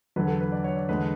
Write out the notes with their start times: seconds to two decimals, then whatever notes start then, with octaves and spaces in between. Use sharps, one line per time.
0.16 E2 D3 F#3 B4
0.28 A4
0.41 B4
0.52 D5
0.64 C#5
0.76 D5
0.89 E2 D3 G#3 B4